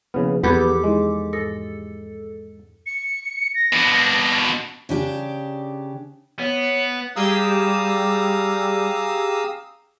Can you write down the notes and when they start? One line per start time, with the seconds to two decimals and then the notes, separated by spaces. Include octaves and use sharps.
0.14 C#3 F3 A#3 B3 E4
0.43 E2 B3 G4 A4 B4 F#5 B5 D6
0.84 G#3 D#4 E4 G#4
1.33 G#2 A4 D#6 A#6
2.86 C#7
3.55 A#6
3.73 B2 D4
4.89 C#3 D4 G4
6.39 B3 C#5
7.16 G3 G4 G#4 F5 A#5 D#6 E6